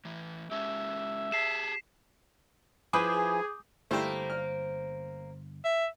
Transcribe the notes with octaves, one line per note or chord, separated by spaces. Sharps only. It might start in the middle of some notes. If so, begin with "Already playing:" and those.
A2 E3
G#3 C#4 G4 E5
G4 G#4 A5 B6 C7 E7
F3 E4 G#4 B4 D6 D#6 G6
G1 A3 A#3 E4 G4 C5
F6
E5